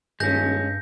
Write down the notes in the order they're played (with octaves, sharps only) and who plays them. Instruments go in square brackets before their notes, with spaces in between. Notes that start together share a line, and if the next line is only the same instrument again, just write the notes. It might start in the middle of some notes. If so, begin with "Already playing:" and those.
[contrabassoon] D#1 [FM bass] G2 [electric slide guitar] G#3 C#4 [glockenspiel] G6 A#6